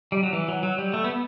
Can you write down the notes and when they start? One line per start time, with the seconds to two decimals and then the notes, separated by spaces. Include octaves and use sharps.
0.12 G3
0.23 F#3
0.33 E3
0.48 F#3
0.63 F#3
0.78 G3
0.94 A3
1.04 B3